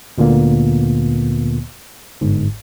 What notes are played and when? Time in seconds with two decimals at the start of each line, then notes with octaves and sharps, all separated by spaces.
0.18 D2 A#2 D3 A#3 B3
2.21 G1 G#2